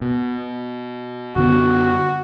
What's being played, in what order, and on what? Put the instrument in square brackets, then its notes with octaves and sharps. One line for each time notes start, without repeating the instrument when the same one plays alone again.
[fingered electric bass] B2
[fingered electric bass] F#2 D3 B3 [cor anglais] F#4